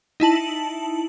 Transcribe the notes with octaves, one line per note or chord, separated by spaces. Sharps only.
D#4 E4 A5 F#7